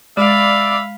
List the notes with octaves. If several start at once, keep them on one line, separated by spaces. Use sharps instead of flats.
G#3 D5 E5 F5 B5